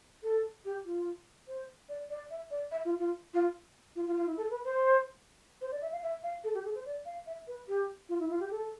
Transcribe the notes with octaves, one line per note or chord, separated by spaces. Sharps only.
A4
G4
F4
C5
D5
D5
E5
D5
E5
F4
F4
F4
F4
F4
F4
E4
A4
B4
C5
C5
D5
E5
F5
E5
F5
A4
G4
A4
C5
D5
F5
E5
B4
G4
F4
E4
F4
G4
A4